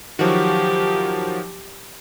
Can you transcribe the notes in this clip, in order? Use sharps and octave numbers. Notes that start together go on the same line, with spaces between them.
D#3 F3 F#3 F#4 G4